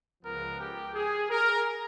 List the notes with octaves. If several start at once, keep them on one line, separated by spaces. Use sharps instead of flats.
C#2 C#3 F3 G#3 B3 A#4
G4
G#4
A#4